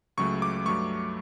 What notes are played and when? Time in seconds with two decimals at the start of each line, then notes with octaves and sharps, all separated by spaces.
0.17 C#2 C#3 F#3 A3 C#6
0.42 D6
0.65 G2 F#3 A3 C#6